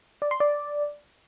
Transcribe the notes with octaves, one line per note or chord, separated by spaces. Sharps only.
D5
C6
D5